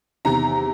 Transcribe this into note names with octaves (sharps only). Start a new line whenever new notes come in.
E2 C3 D#3 A#5